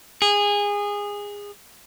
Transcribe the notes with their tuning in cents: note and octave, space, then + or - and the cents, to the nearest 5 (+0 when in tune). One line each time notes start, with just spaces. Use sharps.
G#4 -20